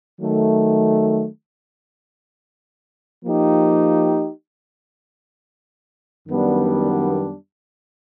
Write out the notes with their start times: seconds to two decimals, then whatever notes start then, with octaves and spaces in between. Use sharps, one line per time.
0.21 D#3 F#3 A3
3.24 F3 A#3 D#4 G4
6.28 F#2 D#3 G3 B3 D4